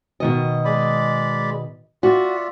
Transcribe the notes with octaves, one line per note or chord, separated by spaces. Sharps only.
B2 D#3 D#5
G#3 D5 B5
F4 F#4 D5 E5